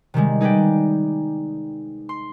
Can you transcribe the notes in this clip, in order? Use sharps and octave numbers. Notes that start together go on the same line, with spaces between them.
C3 D#3 G3 G#3
D#4 G#4 B4 D5 G5
C6